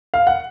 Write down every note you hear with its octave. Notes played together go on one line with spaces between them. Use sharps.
F5
F#5